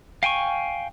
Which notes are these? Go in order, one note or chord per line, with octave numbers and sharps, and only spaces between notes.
F5 G5 G#5 C#6